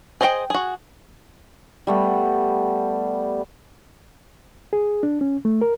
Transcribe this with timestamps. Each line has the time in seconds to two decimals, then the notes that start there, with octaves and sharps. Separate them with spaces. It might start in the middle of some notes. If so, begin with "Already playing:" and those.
0.21 G#4 C5 D#5 F5 G5
0.50 F#4 G#4
1.87 G3 A3 B3
4.73 G#4
5.03 D4
5.21 C#4
5.45 A3
5.61 A#4